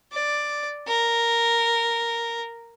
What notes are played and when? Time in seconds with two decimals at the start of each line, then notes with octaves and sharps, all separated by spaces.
0.12 D5
0.87 A#4